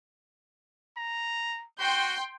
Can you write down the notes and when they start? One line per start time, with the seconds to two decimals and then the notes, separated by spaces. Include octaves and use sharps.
0.97 A#5
1.79 F#4 G5 C6 G6